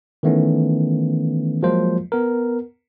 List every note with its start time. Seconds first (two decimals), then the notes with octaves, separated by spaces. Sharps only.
0.23 D#3 E3 A3 B3 C#4
1.63 F3 F#3 G#3 A#3 F4 C5
2.12 B3 A#4